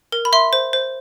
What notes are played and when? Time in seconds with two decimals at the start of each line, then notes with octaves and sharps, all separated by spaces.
0.12 A#4
0.25 B5
0.33 E5 C6
0.53 C5
0.73 C5